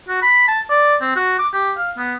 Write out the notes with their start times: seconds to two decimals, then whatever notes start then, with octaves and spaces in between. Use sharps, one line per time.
0.08 F#4
0.22 B5
0.48 A5
0.70 D5
1.01 C4
1.16 F#4
1.39 D6
1.53 G4
1.78 F5
1.98 B3